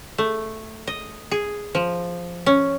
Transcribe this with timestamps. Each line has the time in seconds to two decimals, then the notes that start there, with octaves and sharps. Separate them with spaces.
0.18 A3
0.87 D#5
1.31 G#4
1.75 F3
2.46 C#4